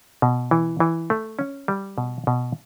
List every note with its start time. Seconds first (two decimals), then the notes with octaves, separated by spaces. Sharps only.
0.22 B2
0.51 E3
0.80 E3
1.10 A3
1.39 C#4
1.68 G3
1.98 B2
2.27 B2